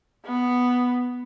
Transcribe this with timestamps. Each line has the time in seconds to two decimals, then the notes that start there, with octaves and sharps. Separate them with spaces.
0.26 B3